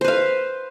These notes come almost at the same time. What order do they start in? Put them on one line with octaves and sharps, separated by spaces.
C5 B4 F5